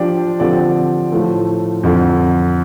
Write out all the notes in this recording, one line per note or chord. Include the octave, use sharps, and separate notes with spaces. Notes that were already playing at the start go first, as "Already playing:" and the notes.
Already playing: F3 D4 G4 D5
D3 F3 C4 G4 D5
A2 F3 A3
F2 D3 F3